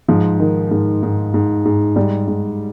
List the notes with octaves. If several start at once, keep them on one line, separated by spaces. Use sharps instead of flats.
G#2 F3
D#3
G#2
G#2
G#2
G#2
G#2 G3
G#2